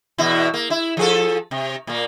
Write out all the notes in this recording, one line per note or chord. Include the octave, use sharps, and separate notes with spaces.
E2 B2 E4
A#3
E4
F3 G#4 A4
C3
A#2 A#3